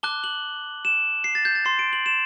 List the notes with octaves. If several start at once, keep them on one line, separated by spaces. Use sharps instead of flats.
A5 D6 F#6 G7
F#7
E7
C7
A6
G6
A6
C6 G6 C7
D7
F#7
E7